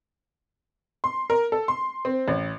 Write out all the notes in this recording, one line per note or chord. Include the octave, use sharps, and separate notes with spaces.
C6
A#4
A4
C6
C4
A1